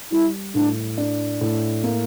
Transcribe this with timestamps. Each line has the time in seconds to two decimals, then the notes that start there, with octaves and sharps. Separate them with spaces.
0.11 G3 E4
0.55 A2 D4
0.98 D4
1.41 A2
1.84 A#3